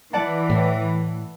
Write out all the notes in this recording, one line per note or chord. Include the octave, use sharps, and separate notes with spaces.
E3 D5 F#5 A5
A2